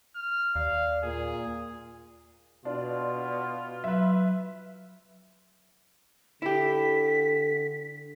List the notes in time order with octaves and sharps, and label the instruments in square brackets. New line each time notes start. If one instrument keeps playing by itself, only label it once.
[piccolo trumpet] F6
[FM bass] D#2 [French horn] D5 [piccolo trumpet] F5
[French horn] A#2 [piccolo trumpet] G#4
[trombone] B2 [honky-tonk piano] D4 [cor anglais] F4
[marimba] F#3 [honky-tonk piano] B4 E5
[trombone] D3 [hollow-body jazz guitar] E4 G4 [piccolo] B6